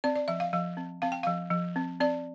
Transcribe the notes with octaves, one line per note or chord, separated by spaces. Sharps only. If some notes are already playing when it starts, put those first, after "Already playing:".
C4 D5
D5
F3 E5
F5
F3 F5
C4
C4 F5
G5
F3 F5
F3
C4
C4 D5